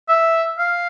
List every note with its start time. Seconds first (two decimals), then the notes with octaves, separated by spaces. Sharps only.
0.08 E5
0.59 F5